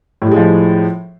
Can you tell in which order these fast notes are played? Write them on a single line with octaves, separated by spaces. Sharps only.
A2 G3 G#3 F3